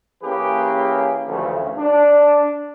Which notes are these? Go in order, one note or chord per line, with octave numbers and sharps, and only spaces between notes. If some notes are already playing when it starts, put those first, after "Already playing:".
E3 A#3 C#4 G4 G#4 B4
D2 G2 C#3 E3 F3 A3
D4